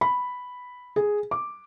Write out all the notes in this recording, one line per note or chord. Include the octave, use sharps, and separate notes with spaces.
B5
G#4
D6